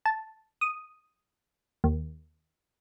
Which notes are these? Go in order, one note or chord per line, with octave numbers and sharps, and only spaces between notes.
A5
D#6
D#2